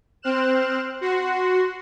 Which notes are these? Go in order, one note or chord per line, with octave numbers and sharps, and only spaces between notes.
C4 C5 F6 F#6 E7
F#4 C6